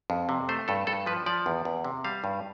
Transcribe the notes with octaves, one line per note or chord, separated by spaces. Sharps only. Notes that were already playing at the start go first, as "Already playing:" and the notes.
F2
C3
A3 C5
G2 A4
G2 A4
F3 B4
F3 D5
E2
E2
C3
G3 F5
G2